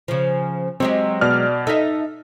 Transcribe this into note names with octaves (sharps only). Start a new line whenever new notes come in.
C#3 F3
F#3 G#3 C4 G4
B2 D5 F6
D#4 A4 E5